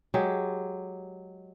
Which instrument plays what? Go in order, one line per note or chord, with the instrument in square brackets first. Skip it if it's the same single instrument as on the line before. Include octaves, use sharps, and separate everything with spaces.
[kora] F#3 G#3 G4 G#4